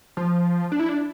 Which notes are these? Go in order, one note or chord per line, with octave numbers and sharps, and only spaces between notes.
F3
D4
E4
D4